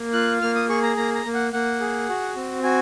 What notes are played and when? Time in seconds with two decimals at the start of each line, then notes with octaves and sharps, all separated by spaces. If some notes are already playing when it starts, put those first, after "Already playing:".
Already playing: A#3
0.13 F4 F#6
0.42 A#3 F6
0.55 D#6
0.69 G#4 C#6
0.83 A#5
0.97 A#3 A#5
1.15 A#5
1.25 A#3
1.34 F#5
1.53 A#3 F#5
1.81 G#4
2.09 F#4
2.36 C4
2.63 F#4 G#5